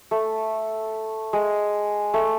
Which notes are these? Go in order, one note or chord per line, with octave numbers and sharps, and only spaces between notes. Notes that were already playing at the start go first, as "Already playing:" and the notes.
A3
G#3
A3